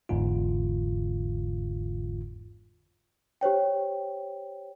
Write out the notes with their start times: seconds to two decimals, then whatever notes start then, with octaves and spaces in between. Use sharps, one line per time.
0.09 G1 E2 G#2 D3 F4
3.41 G4 C5 C#5 G5